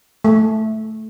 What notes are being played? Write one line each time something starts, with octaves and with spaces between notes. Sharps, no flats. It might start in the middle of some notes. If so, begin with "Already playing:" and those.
A3